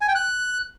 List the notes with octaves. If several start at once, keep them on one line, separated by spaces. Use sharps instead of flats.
G#5
G5
F#6